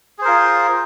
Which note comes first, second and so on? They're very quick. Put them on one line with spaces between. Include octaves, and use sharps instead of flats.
G#4 C5 A#4 F4